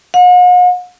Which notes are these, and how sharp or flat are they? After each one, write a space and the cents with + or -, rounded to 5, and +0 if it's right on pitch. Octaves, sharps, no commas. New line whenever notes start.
F#5 -45